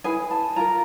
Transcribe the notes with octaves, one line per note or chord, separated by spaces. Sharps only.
E4 G#4 B4 G#5
A5
F4 A#4 A#5